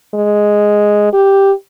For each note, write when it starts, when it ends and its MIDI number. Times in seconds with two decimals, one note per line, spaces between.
0.14 1.09 56
1.13 1.52 67